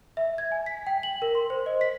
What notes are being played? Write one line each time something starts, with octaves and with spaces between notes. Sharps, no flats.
E5
G#6
G#5
B6
G5
F#7
A#4
C6
C5
D#5
B6